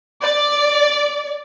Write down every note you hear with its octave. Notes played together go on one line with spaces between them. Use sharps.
D5